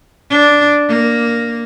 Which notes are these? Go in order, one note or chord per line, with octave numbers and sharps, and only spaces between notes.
D4
A#3